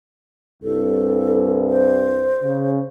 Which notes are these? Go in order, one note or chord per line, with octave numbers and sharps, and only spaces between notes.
C2 G2 A4
C5
C#3